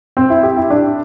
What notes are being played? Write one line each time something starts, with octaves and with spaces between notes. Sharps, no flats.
C4
E4
G4
E4
D4